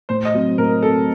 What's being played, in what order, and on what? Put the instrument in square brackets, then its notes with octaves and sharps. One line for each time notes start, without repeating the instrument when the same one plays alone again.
[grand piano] A2 [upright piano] C5
[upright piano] D#5
[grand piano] F#3 C4
[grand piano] A2 [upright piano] A#4
[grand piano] F#3 C4 [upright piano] A4